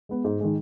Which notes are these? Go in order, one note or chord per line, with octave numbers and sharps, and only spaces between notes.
G#3 B3
G#2
D#3 G#3